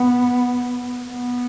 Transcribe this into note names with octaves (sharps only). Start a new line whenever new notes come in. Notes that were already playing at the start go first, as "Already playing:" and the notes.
Already playing: B3
B3